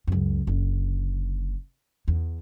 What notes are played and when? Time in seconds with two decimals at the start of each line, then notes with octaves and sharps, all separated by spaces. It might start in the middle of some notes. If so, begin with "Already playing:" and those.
0.07 C#2 F#2
0.47 F#1 D3
2.08 E2